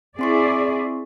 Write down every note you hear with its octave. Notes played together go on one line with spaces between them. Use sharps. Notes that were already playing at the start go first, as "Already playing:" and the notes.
C4 E4 G#4 D5 C6 C#6